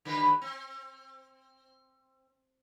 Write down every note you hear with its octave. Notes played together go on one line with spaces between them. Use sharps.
D3 G3 B4
C4